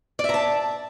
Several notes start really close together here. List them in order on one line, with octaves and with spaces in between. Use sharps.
D5 E5 A#5 A5